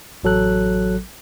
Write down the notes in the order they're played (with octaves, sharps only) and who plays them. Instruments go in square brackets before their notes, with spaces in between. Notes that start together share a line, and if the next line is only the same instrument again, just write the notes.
[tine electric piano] A1 F#3 A4 F#6